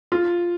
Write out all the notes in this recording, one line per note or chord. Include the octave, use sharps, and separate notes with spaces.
F4